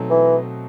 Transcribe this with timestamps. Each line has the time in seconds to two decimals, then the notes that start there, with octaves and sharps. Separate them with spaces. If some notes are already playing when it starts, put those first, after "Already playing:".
Already playing: B2 F#3 A3 C4 D#4
0.10 E3